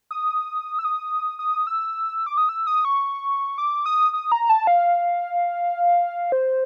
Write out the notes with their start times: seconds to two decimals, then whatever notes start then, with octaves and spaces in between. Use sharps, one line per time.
0.11 D#6
0.79 E6
0.85 D#6
1.39 D#6
1.67 E6
2.26 D6
2.38 D#6
2.49 E6
2.67 D#6
2.85 C#6
3.58 D6
3.86 D#6
4.13 D#6
4.32 A#5
4.49 A5
4.67 F5
6.32 C5